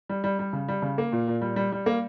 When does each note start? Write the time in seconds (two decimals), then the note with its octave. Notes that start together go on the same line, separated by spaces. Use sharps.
0.09 G3
0.24 G3
0.39 G3
0.53 C#3
0.68 G3
0.82 C#3
0.98 A#3
1.12 A#2
1.28 A#2
1.41 G3
1.56 G3
1.72 G3
1.86 A#3